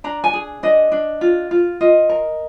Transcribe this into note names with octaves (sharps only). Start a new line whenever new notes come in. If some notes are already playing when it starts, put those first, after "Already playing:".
D4 A#5
G#5
G#4
D4 D#5
D4
F4
F4
F4 D#5
A#4